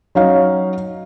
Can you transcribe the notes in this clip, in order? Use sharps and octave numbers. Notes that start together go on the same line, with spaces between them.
F#3 C#4 D#4 F5